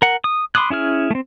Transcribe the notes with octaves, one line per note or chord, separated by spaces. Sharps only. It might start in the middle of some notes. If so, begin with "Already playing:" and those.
A#4 F#5
D#6
B5 C6 D6 D#6 F#6
C#4 E4 G#4 F6
A3 C4